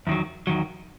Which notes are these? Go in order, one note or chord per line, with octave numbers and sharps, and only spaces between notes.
E2 D#3 F#3
E2 D#3 F#3